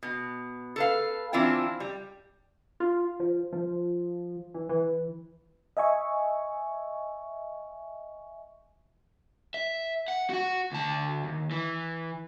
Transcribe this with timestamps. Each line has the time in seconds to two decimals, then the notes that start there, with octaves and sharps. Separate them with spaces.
0.03 B2
0.76 A4 B4 F5
1.33 E3 C4 D4 E4 F4
1.80 G3
2.80 F4
3.20 F3
3.53 F3
4.54 E3
4.69 E3
5.77 D#5 E5 G#5 C#6
9.54 E5
10.08 F#5
10.29 F#4 F#5
10.72 D2 A5
11.24 D#2
11.51 E3